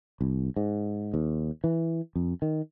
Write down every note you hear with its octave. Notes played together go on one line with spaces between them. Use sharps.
C2
G#2
D#2
E3
F2
D#3